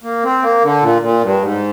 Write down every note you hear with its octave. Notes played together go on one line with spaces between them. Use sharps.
A#3
C4
A#3
D3
A#2
A#2
G2
G#2